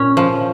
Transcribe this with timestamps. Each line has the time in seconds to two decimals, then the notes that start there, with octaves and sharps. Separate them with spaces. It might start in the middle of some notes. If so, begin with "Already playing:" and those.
Already playing: A#2 C#4
0.17 F3